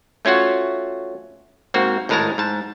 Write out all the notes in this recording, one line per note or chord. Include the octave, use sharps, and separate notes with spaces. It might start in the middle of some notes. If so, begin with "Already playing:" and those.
A3 C#4 F4 F#4 F#5
G#2 A#3 C4 F#4
G#1 A2 G#3 A#4 A5 A#5
G#2 A5